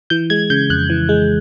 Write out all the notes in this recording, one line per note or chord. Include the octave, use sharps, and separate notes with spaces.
E3 G6
G#3 G#6
C#3 G6
F2 F#6
E3
G#3